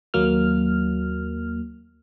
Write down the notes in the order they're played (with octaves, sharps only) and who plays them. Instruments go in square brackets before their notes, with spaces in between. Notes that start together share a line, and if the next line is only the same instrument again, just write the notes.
[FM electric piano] D#2 F#3 A#3 F6